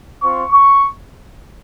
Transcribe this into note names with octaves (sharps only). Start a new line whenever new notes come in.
C4 F4 C#6
C#6